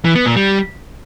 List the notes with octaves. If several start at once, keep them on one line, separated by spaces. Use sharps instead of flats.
E3
B3
A#2
G3